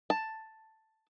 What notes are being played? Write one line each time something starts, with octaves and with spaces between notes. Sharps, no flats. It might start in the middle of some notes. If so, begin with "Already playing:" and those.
A5